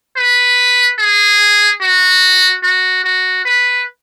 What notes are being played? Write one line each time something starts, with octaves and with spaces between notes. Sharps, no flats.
B4
G#4
F#4
F#4
F#4
B4